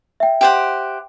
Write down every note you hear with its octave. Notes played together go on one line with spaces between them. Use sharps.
E5 G5
G4 C5 F#5